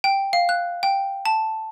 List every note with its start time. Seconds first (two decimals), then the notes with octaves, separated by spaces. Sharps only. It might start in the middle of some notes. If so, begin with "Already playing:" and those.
0.04 G5
0.33 F5
0.49 F#6
0.83 G5
1.25 A5